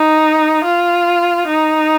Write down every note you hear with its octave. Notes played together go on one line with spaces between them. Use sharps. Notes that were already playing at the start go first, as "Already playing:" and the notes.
Already playing: D#4
F4
D#4